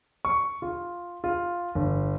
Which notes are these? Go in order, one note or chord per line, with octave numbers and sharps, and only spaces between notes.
C#6
F4
F4
G1